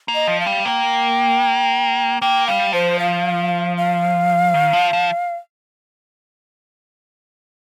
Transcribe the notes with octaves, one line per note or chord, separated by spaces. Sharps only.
A#3
D#5
F3
F5
G3
A#3 G5
A#3 G5
G3 F5
F3 C5
F5
F5
D#3
F3
F3